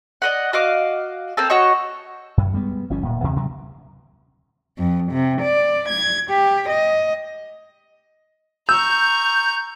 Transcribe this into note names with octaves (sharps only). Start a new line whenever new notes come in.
D5 D#5 F#5
F#4 D#5 F5 D6
A#3 C4 A4
F#4 C#5 D#5 C#6
F#2
G3 G#3 B3
G1 F3 C#4
D1 A#2
D#2 C3 E3
G2 C3 F#3
F2
C3
D5
G#6
G4
D#5
A#5 C#6 E6 G6